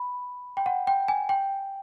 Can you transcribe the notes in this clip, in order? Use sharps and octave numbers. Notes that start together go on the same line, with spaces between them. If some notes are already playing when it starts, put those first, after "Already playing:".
Already playing: B5
G5
F#5
G5
G#5
G5